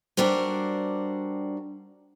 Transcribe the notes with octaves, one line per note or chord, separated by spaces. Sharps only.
G3 D4 F#4 A#4 C5